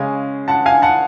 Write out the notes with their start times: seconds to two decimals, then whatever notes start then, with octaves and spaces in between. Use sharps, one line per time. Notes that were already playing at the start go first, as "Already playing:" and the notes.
Already playing: C#3 G#3 C#4 F5 G#5
0.48 F#5 A5
0.66 F5 G#5
0.82 F#5 A5